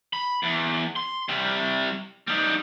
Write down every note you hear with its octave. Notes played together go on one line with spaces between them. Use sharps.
B5
E2
C6
C3 G3
G3 D#4